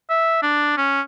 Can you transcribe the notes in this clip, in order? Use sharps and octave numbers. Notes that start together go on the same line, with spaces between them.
E5
D4
C#4